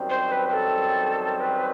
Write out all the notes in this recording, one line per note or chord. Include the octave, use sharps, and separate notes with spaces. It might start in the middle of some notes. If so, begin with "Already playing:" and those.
Already playing: F#2 D#3 G3 C4
C5
B4
B4
A4
B4